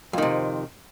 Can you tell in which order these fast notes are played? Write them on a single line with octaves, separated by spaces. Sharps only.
F2 D#3 C3